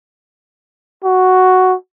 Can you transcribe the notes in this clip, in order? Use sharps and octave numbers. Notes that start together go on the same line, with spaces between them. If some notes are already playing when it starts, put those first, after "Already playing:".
F#4